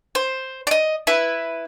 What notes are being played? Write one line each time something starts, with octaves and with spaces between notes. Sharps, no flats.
C5
D5 D#5
E4 B4